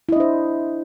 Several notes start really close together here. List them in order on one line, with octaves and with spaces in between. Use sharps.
E4 D#5 D4 C5